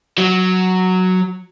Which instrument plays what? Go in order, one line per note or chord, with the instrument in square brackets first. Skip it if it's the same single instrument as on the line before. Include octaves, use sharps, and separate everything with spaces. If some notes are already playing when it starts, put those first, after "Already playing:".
[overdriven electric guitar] F#3